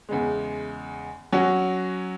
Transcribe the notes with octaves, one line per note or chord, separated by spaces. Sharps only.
E2 C#3 G#3
F#3 C#4 F#4